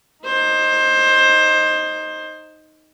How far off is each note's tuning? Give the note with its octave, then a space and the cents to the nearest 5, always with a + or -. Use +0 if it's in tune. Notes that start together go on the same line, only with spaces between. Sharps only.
D#4 +0 C5 +20